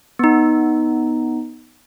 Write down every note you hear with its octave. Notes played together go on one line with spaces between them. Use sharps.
B3 D#4